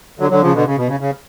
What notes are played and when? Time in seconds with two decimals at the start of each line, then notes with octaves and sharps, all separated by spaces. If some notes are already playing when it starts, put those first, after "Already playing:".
0.19 D3 F#3
0.30 D3 F#3
0.42 C#3 F3
0.54 B2 D3
0.66 C#3
0.77 B2
0.88 C#3
1.00 C#3